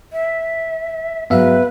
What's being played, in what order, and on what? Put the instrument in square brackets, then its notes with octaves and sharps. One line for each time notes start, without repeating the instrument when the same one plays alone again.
[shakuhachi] E5
[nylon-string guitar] G#2 F#3 [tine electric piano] B3 E5 F5 [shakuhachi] B4